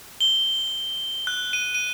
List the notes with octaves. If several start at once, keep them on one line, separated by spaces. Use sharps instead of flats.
G7
F#6
D#7
D#7